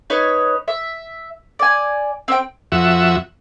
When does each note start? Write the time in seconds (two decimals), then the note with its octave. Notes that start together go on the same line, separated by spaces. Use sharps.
0.10 D#4 B4 C#5
0.68 E5
1.59 D5 G#5
2.28 C4 G5
2.72 F2 F#4 E5